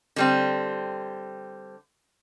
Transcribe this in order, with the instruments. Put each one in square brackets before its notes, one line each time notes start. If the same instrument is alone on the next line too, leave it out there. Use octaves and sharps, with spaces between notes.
[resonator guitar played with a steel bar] D3 G3 C4